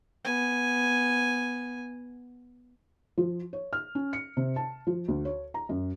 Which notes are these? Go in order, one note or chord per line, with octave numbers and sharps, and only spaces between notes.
B3 G#5
F3
C#5
F6
C#4
C#7
C3
A5
F3
D2
C#5
A#5
F#2